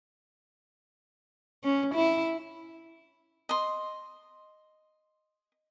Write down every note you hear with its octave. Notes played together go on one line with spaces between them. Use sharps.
C#4
E4
D#5 C6